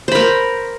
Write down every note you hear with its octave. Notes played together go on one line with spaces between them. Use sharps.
A#4 C5 B5